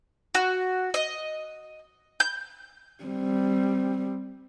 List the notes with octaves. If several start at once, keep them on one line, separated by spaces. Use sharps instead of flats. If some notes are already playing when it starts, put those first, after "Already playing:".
F#4
D#5
G6
G3 C4